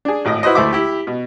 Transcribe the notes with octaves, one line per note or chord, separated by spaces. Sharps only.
D4 G#4
G#1 A2 D#5
E4 F#4 B4 C5 D#5
D2 A3 E4 C5 E5 D6
E4 G4
B2